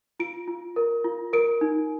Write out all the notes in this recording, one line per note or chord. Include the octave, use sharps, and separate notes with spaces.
F4 D7
F4
A#4
F4
A#4 D7
D#4